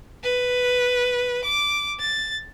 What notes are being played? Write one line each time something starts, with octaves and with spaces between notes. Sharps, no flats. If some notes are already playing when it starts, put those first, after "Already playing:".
B4
D6
A6